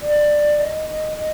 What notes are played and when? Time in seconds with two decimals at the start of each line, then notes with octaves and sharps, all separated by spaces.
0.02 D5
0.60 D#5
0.89 D#5
1.17 D#5